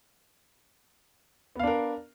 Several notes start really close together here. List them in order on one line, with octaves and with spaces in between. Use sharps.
B3 F5 D4 A#4